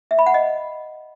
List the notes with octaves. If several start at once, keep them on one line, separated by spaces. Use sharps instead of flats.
E5
B5
F#5
D#5